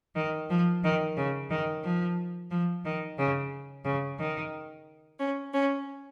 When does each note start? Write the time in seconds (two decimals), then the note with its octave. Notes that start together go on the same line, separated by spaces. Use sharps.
0.15 D#3
0.49 F3
0.83 D#3
1.16 C#3
1.49 D#3
1.83 F3
2.50 F3
2.84 D#3
3.17 C#3
3.84 C#3
4.18 D#3
5.19 C#4
5.53 C#4